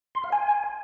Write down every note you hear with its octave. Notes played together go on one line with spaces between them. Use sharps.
C6
F5
G#5